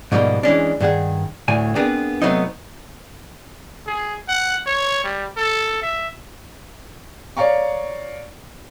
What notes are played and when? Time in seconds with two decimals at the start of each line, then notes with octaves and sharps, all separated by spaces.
0.12 G#2 B2 F3 G3 A#3
0.43 E3 G#3 C#4 D4
0.80 G2 D#3 G#4 F#5
1.48 D2 A2 G#5
1.75 B3 C4 D4 G#4 A#4 B4
2.22 C3 F#3 A3 B3 C4 D#4
3.87 G#4
4.28 F#5
4.67 C#5
5.04 G3
5.37 A4
5.82 E5
7.37 C#5 D5 F5 A#5 C#6